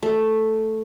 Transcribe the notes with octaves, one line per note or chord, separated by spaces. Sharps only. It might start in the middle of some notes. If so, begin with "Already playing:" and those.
A3